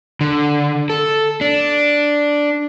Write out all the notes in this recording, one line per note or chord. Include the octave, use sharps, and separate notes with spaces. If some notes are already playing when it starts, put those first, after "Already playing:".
D3
A4
D4